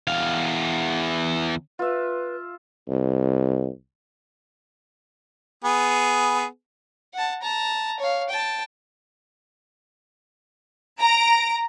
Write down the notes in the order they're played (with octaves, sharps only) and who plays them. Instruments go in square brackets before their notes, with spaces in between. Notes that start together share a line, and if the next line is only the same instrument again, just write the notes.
[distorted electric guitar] E2 F5
[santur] F4 E5 [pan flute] B4
[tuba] C2
[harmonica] B3 G#4
[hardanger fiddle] F#5 A5
A5 A#5
C#5 F5
G5 A5
[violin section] A#5 D7